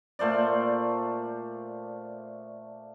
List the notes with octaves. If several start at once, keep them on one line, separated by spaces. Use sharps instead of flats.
A#2 A3 C5 D5